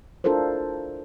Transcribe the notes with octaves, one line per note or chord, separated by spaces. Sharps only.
D4 E4 F4 A4 A#4 C5